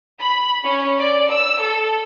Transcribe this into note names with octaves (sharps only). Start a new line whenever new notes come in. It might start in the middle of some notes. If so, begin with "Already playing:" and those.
B5
C#4
D5
E6
A4